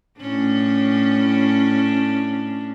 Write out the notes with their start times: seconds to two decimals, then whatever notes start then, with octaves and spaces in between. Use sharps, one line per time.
0.20 A2 C#4 D4